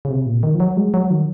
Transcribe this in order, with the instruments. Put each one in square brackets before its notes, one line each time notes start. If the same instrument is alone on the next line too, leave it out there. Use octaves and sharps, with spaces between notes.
[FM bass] C#3
C3
A#2
D#3
F3
F#3
G#3
F#3
D#3